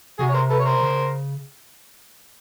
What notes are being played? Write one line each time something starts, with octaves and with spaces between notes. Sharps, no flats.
C3 F#4 G#4
C#5
A#4 C5
A4 B4
C#5
A#4 C5
C#3